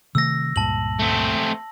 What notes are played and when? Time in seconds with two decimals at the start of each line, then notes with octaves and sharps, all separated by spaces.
0.15 C3 D#3 A3 E6 A#6
0.56 C#2 G2 A#2 A5 F#7
0.99 A3 C4